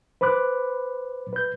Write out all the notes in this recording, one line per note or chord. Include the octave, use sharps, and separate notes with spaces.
B4 C5 B5 D6 F#6
B4 G6